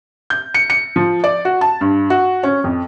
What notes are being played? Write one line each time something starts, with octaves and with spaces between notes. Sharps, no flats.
G6
C#7
C#7
F3
D5
F#4
A5
G2
F#4
C#4
F2